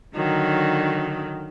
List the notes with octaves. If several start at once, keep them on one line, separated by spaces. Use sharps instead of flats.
D3 D#3 F#3